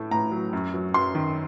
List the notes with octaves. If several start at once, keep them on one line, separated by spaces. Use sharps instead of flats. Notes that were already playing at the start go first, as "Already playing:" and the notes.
Already playing: A2 A3
A2 A#5
F#3
F#2
F#3
F#2 C6
D#3